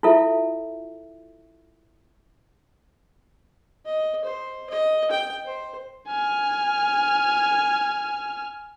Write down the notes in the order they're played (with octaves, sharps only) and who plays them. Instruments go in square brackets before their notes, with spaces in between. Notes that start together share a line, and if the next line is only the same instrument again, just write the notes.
[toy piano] E4 F4 A4 E5
[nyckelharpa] D#5
C5
D#5
G5
C5
[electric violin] G#5 F6